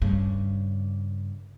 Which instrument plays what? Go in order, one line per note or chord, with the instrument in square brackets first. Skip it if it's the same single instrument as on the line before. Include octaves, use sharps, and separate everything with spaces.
[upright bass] G2 C#3